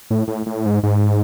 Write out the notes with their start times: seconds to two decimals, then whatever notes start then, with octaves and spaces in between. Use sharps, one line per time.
0.10 A2
0.28 A2
0.46 A2
0.66 G#2
0.83 G#2